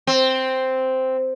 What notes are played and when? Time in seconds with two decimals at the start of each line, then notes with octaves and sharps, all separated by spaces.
0.07 C4